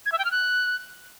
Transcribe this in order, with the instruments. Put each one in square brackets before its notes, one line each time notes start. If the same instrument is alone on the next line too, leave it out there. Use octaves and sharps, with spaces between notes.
[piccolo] G#6
E5
G5
F6
F#6